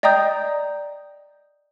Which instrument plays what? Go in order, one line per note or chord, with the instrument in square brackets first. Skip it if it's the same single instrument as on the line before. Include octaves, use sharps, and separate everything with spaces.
[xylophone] D5 D#5 G5 A#5 D#6 G6